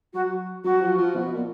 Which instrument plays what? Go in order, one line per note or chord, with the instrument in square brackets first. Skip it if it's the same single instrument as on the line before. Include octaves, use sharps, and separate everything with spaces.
[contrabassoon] F#3 [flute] F#4
[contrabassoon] F#3 [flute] F#4
[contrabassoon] F3
F3
B2
A#2